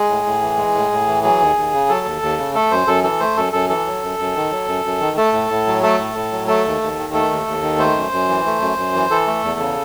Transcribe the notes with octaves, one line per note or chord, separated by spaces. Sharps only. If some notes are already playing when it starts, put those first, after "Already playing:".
Already playing: G#3 G#4
A2
A2
E3
G#3
A2
A2
E3
F#3 G#4
D#2
D#2
C#3
F#3 A4
D#2
D#2
C#3
A3 A4
F#2 C5
F#2 A4
E3 A4
A3 C5
F#2 A4
F#2 A4
E3 A4
F#3
F#2
F#2
D#3
F#3
F#2
F#2
D#3
A3 A4
A2
A2
F#3
A3 A4
A2
A2
F#3
A3 A4
D#2
D#2
D#3
A3 A4
D#2
D#2
D#3
A3 C5
F#2
F#2
E3
A3
F#2
F#2
E3
E3 A4
A3
E2
C#3